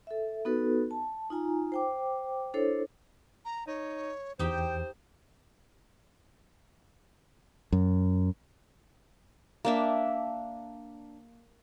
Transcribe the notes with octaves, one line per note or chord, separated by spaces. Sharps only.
A4 E5
B3 D#4 F#4 A4 B4
A5
D#4 F4 G#5 A#5
C5 G5 D6
D4 E4 A4 C5 C#5
A#5
D#4 C#5
E2 D#4 G4 C5 G5
F#2
A#3 D4 E5